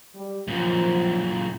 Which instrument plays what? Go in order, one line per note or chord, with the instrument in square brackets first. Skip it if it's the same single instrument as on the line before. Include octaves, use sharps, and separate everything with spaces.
[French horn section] G3
[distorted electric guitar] F#2 A#2 [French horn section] F3